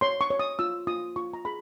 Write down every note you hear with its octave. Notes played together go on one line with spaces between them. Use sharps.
C#5 C6
C#6
C#5
D#6
F4 E6
F4 D#6
F4 C#6
A#5
G#4 B5